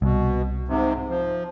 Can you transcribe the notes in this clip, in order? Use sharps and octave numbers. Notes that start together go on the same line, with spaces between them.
C2 B2
G#2 C3
F3